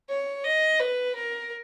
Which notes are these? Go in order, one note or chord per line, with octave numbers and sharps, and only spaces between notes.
C#5
D#5
B4
A#4